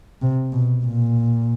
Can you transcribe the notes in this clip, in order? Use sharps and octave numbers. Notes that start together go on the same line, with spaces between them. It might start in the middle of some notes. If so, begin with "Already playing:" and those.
C3
B2
A#2